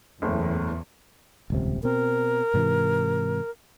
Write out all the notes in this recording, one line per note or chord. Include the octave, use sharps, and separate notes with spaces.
F#1 E2 A2
D#1 C#2 C3
B2 C4 A#4
G#2 C3 E3